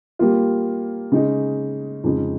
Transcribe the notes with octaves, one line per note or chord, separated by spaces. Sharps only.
G3 A#3 F4
C#3 G#3 D#4 G#4
F2 C#3 G#3 D#4